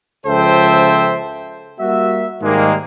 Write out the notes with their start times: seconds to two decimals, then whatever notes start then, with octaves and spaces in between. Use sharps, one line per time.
0.26 C#2 F3 A4 C5 E5 G5
1.80 G3 A#3 F#4 E5
2.43 G#2 D#3 G3 G#3 A#3